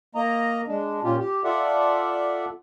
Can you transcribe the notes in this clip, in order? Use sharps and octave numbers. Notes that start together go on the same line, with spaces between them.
A#3 D#5 A#5
G#3 D4
A#2 C#4 F4 G4
G4
F4 A4 D5 E5 F#5